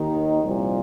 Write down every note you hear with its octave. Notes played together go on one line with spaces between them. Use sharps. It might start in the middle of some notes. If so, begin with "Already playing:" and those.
Already playing: D#2 D#3 D#4
C2 A#2 F3